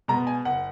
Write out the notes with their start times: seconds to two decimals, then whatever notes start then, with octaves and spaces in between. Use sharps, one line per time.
0.08 B2 G#3 B3 A#5
0.27 G#5
0.45 F#1 F#5